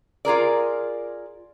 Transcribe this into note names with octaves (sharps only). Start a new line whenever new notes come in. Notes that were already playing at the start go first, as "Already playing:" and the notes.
F4 G#4 A#4 D5